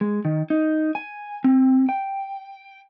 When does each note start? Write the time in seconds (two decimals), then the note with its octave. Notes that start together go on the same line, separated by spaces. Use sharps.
0.01 G#3
0.25 D#3
0.50 D#4
0.95 G#5
1.44 C4
1.89 G5